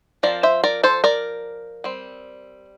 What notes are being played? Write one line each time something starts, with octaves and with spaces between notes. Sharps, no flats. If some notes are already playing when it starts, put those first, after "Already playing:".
F3 C4 A#4 D5
C5 E5
A#4 D5
A4 C5
A#4 D5
G3 C4